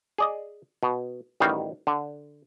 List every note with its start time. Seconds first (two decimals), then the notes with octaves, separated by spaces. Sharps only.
0.18 G#4 D5 D#5
0.83 B2
1.40 A1 D#3 G3 D#4 F#4 F5
1.87 D3